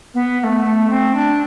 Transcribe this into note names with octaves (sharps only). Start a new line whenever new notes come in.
B3
B3
A3
A3
C4
D4